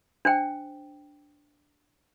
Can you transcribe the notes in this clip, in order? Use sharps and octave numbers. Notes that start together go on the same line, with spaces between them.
D4 C5 G5